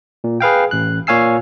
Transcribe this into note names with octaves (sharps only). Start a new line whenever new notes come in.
A#2
G#4 B4 F5 G5
A1 F#6
A#2 C#5 F5 G#5 E6 C7